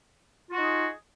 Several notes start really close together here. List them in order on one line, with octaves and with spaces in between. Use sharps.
F4 F#4 D#4 G#4